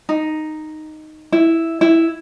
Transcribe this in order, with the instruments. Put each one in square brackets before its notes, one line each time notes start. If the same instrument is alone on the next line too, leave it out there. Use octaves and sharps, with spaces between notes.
[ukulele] D#4
E4
E4